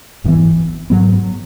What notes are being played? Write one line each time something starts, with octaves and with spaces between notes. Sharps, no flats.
G#1 F#2 E3 B3
G#2 F#3 B3